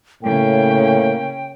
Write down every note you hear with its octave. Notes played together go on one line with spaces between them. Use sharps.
A2 C#3 A#3 C#4 G5